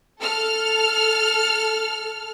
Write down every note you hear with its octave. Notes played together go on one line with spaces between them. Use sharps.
A4 F6